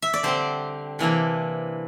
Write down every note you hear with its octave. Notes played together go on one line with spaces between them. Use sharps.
E5
D5
D3 G3 C4 C5
C3 E3 A#3 D4